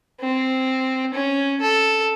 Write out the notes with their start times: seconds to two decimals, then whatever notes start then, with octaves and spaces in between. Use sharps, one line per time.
0.20 C4
1.14 C#4
1.61 A4